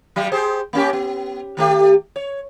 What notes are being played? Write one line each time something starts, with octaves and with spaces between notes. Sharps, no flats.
F#3 G3
G4 G#4 C5
A#3 C#4 G4
B3
D#3 A3 G4
C#5